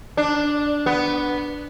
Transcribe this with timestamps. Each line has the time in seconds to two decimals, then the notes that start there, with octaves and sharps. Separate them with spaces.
0.17 D4
0.86 B3